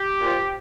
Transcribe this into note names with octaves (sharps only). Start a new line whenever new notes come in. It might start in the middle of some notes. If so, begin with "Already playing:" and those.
Already playing: G4
A#2 F3